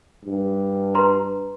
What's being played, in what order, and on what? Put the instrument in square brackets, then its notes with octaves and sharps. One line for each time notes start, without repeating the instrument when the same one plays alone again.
[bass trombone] G2
[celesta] B4 A#5 C6